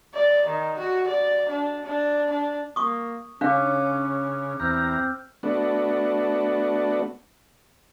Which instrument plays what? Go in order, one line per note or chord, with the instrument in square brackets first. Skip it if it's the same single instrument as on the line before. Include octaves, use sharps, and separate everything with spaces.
[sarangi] D5
D#3
F#4
D5
D4
D4
D4
[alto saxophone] A#3 [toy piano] C#6 D#6
[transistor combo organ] C#3 [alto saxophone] C#4 [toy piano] D4 F5 [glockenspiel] D6 F#6
[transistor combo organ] E2 A#5 [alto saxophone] C4 [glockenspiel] E6 F6 G6
[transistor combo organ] A3 B3 D4 F#4